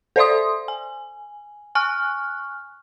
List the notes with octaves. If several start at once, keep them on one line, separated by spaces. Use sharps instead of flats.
A4 C5 D5 E5 C6 D#6
G#5
G#5 C#6 F6 F#6